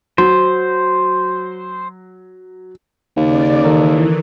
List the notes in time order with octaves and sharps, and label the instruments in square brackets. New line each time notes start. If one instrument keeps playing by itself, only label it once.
[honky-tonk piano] F#3 [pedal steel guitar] C5
[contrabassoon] D#2 [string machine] C#3 D5
[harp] D#3 A4 A#4 [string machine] E3